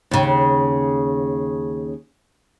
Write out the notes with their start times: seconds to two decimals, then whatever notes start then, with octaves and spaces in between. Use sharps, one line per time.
0.11 D#2 C#3